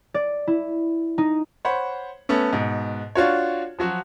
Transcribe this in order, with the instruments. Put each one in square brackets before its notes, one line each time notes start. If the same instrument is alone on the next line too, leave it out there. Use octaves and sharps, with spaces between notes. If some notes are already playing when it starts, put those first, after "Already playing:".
[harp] D5
E4
D#4
[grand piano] C5 C#5 F#5 B5
A3 B3 C#4
G#2 B2
D4 F4 F#4 C#5
F3 F#3 F#4